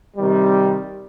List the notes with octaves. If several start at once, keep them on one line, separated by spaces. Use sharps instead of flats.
C3 D#3 G3